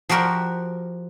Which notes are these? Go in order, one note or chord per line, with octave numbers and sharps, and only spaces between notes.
F3 F#4 G4 A#4